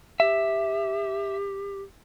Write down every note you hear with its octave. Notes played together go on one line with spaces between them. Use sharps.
G4 E5